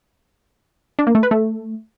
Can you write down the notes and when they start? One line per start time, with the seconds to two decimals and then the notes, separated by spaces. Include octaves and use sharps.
0.99 D4
1.07 A#3
1.15 A3
1.23 B4
1.31 A3